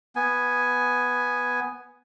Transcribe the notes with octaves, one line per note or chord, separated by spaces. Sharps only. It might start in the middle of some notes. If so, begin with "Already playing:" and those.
B3 G#5